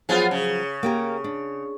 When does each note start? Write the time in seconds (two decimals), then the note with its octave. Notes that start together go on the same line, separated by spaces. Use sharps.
0.09 F3 F#3 B3 F4 G#4 B4
0.31 C#3
0.83 A#3 G4 A#4
1.24 D4